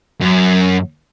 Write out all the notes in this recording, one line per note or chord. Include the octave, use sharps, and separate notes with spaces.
F#2